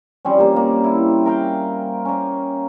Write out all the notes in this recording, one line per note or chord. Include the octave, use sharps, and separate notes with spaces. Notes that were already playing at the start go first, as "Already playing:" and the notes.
F3 G3 C4 C#4
G3 A#3
A#3
E4
A#4 F5 G5
A#3 C#4